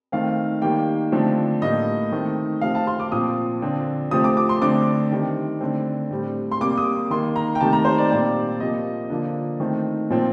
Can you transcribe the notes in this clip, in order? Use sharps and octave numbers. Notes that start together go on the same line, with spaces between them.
D#3 A3 C4 F5
D#3 G3 A#3 G5
D3 F3 A3 C4
A2 G3 A#3 D#5
D#3 A3 C4
C3 F3 A3 C4 F5
A5
C6
D6
A#2 F3 C4 D#6
D3 F3 C4
C3 F3 A3 C4 D#6
D6
D6
C6
D3 A3 C4 D6
D#3 G3 C4
D3 A3 C4
A2 G3 C4
C6
C3 G3 A#3 D6
D#6
D#3 A#3 C6
A#5
G5
C3 D#3 A3 A5
A#5
C5
D5
A#2 G3 C4 D5
C3 F3 A#3 D#5
D3 F3 A#3
D#3 A3 C4
A#2 F3 C4